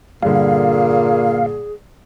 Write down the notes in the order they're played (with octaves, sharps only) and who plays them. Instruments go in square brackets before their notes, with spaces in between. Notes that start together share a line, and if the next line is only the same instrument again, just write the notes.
[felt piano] G2 D3 [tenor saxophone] A#2 [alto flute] G#4 [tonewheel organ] F5